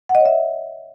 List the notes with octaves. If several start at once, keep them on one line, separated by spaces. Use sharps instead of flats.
F#5
D#5
C#5
E5